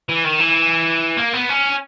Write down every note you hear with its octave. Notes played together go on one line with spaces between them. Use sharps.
E3
D#3
E3
A#3
B3
C#4